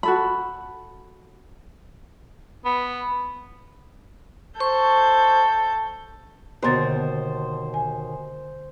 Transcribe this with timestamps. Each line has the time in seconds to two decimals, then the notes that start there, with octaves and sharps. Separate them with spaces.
0.03 F#4 A4 B5
2.65 B3
4.60 A4 C5 C#6 G6
6.63 D#2 B2 D3 C5 A#5 A6
7.74 G#5